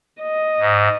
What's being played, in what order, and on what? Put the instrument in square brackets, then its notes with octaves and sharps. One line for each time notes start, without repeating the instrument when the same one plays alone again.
[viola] D#5
[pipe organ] G#2